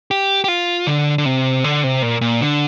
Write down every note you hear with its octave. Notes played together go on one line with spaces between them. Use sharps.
G4
G4
F4
D3
D3
C3
D3
C3
A#2
A#2
D3